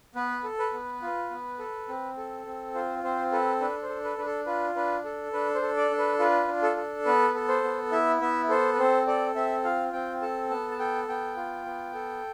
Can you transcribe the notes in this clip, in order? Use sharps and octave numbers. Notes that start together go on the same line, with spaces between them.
B3 B4
A4
B4
B3
F4
B3
A4
C4
A4
C4
F4 C5
C4 C5
A4 B4
D4 B4
C5
A4
B4
D4 B4
A4
F4 B4
D4 B4
A4
D4 B4
C5
A4
D5
D4
B4
F4 B4
D4
A4
A4
B3 B4
A4
C5
B3
E4 E5
B3 E5
A4 C5
B4
C4 C5
A4 D5
C4 E5
F4 F5
C4 G5
A4 A5
B3 A5
A5
A4 G5
B3 G5
F4
B3
A4